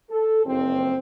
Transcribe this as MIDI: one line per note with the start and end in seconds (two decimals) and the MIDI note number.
0.10 0.44 69
0.46 0.97 30
0.46 0.97 41
0.46 0.97 60